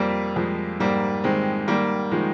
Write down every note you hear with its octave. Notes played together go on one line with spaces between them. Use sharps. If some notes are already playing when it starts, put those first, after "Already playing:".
Already playing: F2 G3 A#3
F2 F3 G#3
G#2 G3 A#3
D#3 G#3 C4
D#3 G3 A#3
D#3 F3 G#3